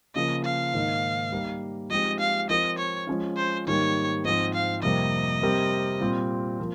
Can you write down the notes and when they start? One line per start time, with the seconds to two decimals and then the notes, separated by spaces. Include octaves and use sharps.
0.15 C#3 F3 A#3 D#5
0.45 F5
0.74 G#2 D#3 A#3 D#4
1.32 G3 A#3 D#4 A#4
1.90 F3 G#3 C4 D#4 G4 D#5
2.20 F5
2.49 F3 C4 F4 A#4 D#5
2.78 C#5
3.07 F3 G#3 C#4 F4
3.37 C5
3.67 G#2 D#3 G3 A#3 D#4 C#5
4.25 G#2 F3 C4 D#5
4.54 F5
4.83 F2 C3 G3 A#3 D#5
5.42 C3 G3 C4 G4 A#4
6.01 A#2 G3 C4
6.60 F3 A#3